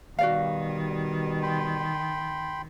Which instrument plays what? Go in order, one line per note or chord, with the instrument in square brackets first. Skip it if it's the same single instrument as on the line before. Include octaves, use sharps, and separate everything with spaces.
[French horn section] B2 G3 [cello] D#3 [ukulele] F#4 D5 F5
[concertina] G5 B5 C6